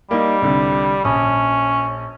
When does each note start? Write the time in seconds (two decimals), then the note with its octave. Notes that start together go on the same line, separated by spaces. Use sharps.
0.11 G3 A#3 D#4
0.42 C2 D3
1.04 A#1 C#4 D#6